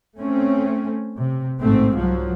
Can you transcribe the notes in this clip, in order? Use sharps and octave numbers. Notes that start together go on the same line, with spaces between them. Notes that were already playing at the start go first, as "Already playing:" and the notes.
A3 C4 C#4
C3
A1 G#2 A3 C4
C2 F3 F#3